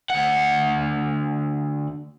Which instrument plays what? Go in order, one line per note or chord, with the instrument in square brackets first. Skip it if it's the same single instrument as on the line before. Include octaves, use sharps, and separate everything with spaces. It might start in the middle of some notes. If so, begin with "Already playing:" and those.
[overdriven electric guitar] D2 F#5